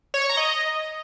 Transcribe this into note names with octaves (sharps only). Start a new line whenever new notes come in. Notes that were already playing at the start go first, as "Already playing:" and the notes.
C#5
C#6
A#5
D#5